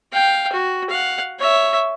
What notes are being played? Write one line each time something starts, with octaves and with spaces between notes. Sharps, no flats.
F5 G5
F#4
F5 F#5
C#5 E5